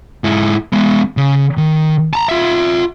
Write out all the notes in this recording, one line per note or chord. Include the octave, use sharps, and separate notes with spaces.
G#2 E4
G#3 B3
C#3
D#3
A5 A#5
F4 E5